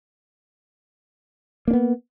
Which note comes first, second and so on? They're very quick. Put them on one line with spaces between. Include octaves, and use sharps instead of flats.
A#3 D4 B3